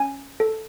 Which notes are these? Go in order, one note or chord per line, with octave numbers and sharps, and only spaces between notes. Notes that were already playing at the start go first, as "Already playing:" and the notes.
Already playing: C#4 G#5
A4